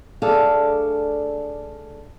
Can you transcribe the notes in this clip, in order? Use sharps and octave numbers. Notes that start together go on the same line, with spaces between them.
A3 D4 G#4 A4 D5 F5